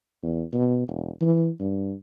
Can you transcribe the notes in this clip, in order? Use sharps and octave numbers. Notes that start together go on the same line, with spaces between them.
E2
B2
E1
E3
G2